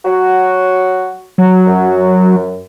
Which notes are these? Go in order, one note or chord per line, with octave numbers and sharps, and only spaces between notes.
F#3 F#4
F#3
F#2